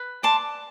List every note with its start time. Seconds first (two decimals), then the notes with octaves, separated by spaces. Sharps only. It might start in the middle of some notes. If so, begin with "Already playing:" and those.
Already playing: B4
0.23 D5 A5 C6